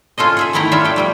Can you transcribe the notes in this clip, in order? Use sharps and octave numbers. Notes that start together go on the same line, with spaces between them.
C#4 F4 A4 C5 D#5
G#4 A4 E5
D#3 A3 B3 E4 G5 A#5
G3 D4 F4 C#5 E5 F#5
A4 G5
F3 G3 A3